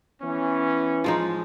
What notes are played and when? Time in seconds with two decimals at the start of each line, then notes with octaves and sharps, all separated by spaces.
0.22 E3 B3 C#4
1.04 F3 G#3 D#4